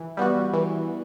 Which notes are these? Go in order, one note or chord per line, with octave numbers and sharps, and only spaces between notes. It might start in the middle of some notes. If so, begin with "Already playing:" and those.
Already playing: E3
G3 B3 F#4
E3